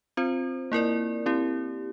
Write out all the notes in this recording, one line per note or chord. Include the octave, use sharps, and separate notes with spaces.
C4 F4 C5
A#3 E4 A#4 D5
C4 E4 G4